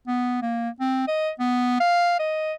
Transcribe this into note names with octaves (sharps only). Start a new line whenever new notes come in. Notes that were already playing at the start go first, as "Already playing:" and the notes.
B3
A#3
C4
D#5
B3
F5
D#5